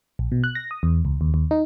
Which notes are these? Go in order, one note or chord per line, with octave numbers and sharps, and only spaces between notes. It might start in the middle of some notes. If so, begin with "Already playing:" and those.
A#1
B2
F#6
A#6
D#6
E2
C#2
D#2
D#2
D#4